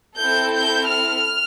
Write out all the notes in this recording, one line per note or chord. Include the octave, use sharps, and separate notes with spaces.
C4 E4 A4 G6
G6
F6